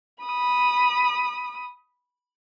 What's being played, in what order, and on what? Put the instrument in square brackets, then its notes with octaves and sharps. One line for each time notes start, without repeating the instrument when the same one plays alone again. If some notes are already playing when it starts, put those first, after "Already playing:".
[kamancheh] B5 D#6